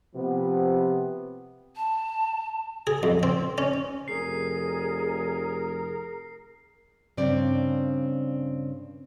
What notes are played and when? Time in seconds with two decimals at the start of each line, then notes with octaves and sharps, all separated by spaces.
0.14 C3 F3 B3
1.76 A5
2.87 G#4
3.03 F2
3.23 C4
3.58 C#4
4.08 F1 G#4 A#4 C7
7.17 G2 C#3 C4 D5